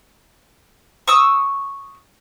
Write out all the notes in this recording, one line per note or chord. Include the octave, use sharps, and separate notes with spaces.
C#6 D#6 E6